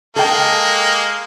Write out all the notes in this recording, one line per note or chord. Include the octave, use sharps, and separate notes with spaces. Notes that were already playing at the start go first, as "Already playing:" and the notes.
G#3 A#3 A4 G5